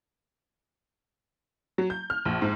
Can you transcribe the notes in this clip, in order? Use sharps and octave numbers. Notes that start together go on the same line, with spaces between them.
F#3
G6
F6
A#1
G#2